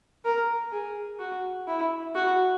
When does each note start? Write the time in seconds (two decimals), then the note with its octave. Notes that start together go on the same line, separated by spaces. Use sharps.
0.25 A#4
0.71 G#4
1.19 F#4
1.67 E4
2.15 F#4